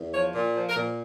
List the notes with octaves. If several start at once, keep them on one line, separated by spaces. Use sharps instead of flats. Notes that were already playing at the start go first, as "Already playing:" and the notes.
Already playing: E2
F3 C#5
A#2
F3
A#4
A#2